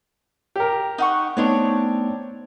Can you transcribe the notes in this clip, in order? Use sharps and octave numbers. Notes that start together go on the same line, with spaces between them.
G4 A#4
D#4 F#5 C#6
A3 B3 C4 D4 D#4 C#5